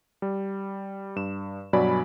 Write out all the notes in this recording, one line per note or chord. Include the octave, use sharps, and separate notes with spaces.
G3
G2 E7
G2 B2 F#3 D5 G#5 B5